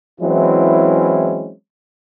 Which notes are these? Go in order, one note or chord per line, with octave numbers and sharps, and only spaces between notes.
E3 F#3 G#3 C4 C#4 E4